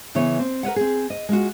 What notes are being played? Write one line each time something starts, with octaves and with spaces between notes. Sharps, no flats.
C#3 E3 B3 C#5
C4
A#4 B4 C#5 F#5
C4 G#4
D#5
G#3 F4 F#4